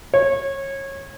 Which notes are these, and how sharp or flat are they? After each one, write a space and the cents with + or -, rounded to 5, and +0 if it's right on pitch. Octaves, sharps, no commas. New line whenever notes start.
C#5 -25